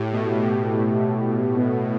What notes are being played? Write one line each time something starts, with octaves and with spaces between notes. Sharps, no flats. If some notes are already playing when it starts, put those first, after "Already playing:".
Already playing: A2 G4
B2 A3
A2 G4
A3
A3
A3
B3